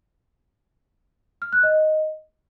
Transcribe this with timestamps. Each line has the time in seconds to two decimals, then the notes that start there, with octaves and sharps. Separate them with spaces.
1.42 F6
1.53 F#6
1.63 D#5